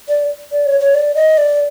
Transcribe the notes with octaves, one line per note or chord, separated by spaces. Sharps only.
D5
D5
C#5
C#5
D5
D#5
D5